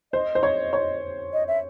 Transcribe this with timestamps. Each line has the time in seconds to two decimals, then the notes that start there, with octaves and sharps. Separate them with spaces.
0.13 C5 D#5
0.35 C5
0.43 C#5
0.73 C#5
1.33 D#5
1.48 E5